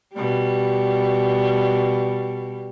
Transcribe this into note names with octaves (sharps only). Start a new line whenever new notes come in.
B2 G3